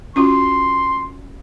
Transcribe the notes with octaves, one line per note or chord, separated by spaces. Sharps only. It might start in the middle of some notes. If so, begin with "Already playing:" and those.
C#4 F4 F#4 C6